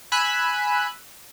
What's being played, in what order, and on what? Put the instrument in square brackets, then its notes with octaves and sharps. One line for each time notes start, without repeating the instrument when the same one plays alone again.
[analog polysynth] G#5 B5 E6 F#6